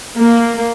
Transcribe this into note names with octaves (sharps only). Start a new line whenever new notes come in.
A#3